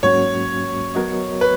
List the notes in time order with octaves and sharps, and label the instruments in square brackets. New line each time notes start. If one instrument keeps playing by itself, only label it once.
[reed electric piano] G#2 F#3 A#3 C#4 F#4 [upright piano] C#5
[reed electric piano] F#3 B3 F#4 A#4 D#5
[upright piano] B4